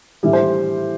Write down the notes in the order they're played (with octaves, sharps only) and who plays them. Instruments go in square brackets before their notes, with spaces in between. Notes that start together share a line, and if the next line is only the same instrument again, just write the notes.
[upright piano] A2 E3 G3 E4
C5